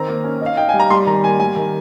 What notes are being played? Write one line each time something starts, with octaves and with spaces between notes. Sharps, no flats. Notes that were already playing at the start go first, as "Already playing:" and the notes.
Already playing: D#3 C4 A#5
A#3
C#4
D#4
F5
D#4 G5
G3 G#5
A#5
G3 C6
D#3 A#5
A#3 G#5
G3 G#5
D#3